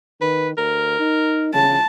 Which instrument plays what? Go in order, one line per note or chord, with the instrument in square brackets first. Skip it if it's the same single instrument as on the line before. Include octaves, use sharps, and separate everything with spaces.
[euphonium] D#3 [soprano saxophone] B4
[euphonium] D2 [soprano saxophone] A#4
[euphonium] D#4
[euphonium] C#3 [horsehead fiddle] A5